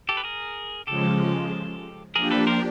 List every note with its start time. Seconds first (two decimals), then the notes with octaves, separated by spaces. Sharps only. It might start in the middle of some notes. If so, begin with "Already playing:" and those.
0.09 G4 A4
0.17 B4
0.24 G#4 A#4
0.87 C#3 F3 G#3 G4 A4
2.15 F3 A#3 D4 G4 G#4 A#4
2.31 A4 B4
2.47 A#4 C5